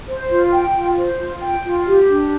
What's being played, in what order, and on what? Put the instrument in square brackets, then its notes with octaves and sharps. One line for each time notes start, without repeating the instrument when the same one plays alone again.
[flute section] C5
F4
G5
F4
C5
F4
G5
F4
G4
D4